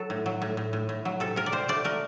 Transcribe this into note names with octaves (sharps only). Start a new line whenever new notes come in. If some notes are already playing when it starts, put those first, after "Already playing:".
Already playing: F#3 A4
A2
F#3
A2
A2
A2
A2
F#3
C3 A4
C3 A#4
D5
C3 C5
A3 D5
A3 A#4